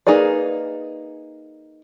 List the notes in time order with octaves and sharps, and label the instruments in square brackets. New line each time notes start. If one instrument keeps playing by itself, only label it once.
[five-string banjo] A#3 D#4 G#4 B4 D5